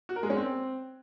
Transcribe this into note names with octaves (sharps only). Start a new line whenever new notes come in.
F#4
A#4
G#3
C#4
C4